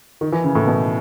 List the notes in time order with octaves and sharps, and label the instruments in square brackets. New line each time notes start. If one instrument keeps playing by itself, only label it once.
[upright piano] D#3
E3
C#3
A2
B2